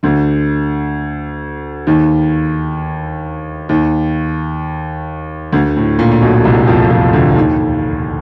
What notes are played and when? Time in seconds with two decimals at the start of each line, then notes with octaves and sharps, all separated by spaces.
0.03 D2 D3
1.87 D#2 D#3
3.69 D#2 D#3
5.52 D2 D3
5.77 A2
5.99 A#2
6.12 A#2
6.22 B1 B2
6.44 C2 C3
6.67 F2 F3
6.90 F2 F3
7.13 D2 D3
7.36 D#2 D#3